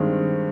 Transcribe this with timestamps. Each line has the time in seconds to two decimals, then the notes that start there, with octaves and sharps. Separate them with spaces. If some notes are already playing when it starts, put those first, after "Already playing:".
Already playing: G2 D#3 G#3 C4